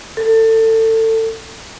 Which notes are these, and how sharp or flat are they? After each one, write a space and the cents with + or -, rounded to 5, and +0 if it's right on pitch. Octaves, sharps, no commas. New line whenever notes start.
A4 +25